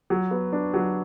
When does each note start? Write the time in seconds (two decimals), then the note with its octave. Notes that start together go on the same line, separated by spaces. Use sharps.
0.10 F#3
0.31 B3
0.53 D4
0.74 F#3